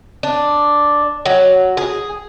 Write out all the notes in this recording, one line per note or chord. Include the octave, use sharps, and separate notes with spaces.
D4
F#3
G#4